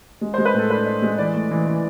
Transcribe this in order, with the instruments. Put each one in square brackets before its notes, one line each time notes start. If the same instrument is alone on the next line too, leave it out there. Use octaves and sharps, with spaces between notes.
[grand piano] G#3
G#3 C5
B4
A2 A4
D4 B4
D4
G#3
E3 D5
A3
E3
E3